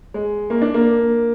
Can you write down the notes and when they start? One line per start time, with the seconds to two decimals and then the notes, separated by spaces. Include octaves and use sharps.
0.14 G#3
0.50 A#3
0.62 D4
0.74 A#3